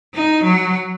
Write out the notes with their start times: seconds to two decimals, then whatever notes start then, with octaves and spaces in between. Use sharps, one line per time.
0.14 D#4
0.44 F#3